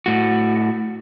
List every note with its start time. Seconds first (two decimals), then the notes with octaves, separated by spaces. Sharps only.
0.06 A2 F#4